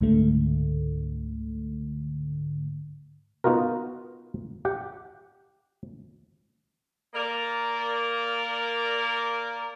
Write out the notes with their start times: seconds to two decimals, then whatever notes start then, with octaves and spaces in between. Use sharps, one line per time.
0.01 C#2 G#2 D3 A3
3.44 B3 D#4 F4 F#4 A#4
4.65 G4 F#5 G5
7.14 A#3 A#4 D5